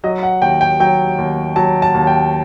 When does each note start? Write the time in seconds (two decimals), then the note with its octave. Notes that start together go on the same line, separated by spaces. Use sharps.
0.04 F#3 D#5
0.23 F#5
0.41 D#2 G5
0.61 G5
0.80 F#3 G5
1.18 D#2
1.56 F#3 A5
1.82 A5
1.94 D#2
2.07 G5